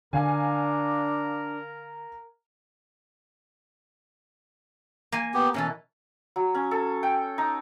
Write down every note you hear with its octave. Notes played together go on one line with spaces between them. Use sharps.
D3 D4 A#4 F5 G#5
A#3 G#5
B3 G4
B2 E3 C#4 A4
F#3
C#4
A4
G5
D#4